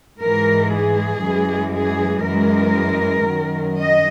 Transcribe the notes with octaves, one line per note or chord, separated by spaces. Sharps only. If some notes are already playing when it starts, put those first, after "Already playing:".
G#2 E3 G#3 A#4
G#4
F#2 E3 G#3
G#4
F#2 E3 G#3 A#4
F#2 D#3 F#3
D#5